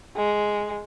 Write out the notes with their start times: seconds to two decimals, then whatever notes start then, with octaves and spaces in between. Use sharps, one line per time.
0.17 G#3